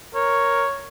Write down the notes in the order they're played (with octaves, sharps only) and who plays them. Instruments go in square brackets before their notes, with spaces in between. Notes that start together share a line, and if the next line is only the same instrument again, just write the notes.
[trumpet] A#4 [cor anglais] C#5